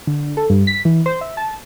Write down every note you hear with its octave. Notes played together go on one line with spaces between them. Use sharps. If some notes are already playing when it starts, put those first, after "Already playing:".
D3
A4
G2
B6
E3
C5
E5
A5